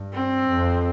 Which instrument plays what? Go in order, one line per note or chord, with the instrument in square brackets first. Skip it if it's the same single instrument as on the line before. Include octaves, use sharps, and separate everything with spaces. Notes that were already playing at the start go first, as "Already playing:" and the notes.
Already playing: [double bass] G2
[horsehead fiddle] C4
[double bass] F2